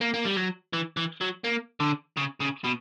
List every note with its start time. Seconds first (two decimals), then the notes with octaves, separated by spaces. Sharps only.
0.01 A#3
0.14 A#3
0.25 G3
0.37 F#3
0.73 E3
0.97 E3
1.21 F#3
1.44 A#3
1.80 D3
2.17 C#3
2.40 C#3
2.64 B2